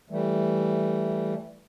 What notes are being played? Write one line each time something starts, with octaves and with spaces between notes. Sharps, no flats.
E3 G3 A3